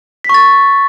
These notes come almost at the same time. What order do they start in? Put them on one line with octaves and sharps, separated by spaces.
B6 C#6 A6